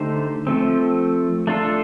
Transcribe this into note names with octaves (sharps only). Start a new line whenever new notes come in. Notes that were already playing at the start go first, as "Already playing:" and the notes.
Already playing: D3 A3 D#4 G4 C5
F3 A3 C4
A3 D4 F4 A4